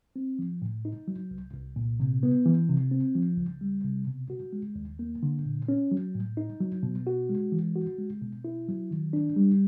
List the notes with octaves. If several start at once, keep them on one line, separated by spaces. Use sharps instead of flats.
C4
F3
A2
D#4
F#3
C2
C2
A#2
C3
B3
E3
C3
C4
F3
C#2
G3
C3
B2
F#4
G#3
D#2
A#3
D3
A#2
C#4
F#3
A2
D#4
F#3
B2
F#4
G#3
E3
F#4
G#3
B2
E4
F#3
D#3
D4
G3